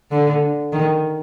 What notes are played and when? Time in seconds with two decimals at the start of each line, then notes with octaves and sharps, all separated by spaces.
0.11 D3
0.73 D#3